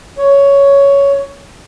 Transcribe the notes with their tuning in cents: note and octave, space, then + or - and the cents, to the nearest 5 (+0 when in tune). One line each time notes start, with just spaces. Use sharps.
C#5 +10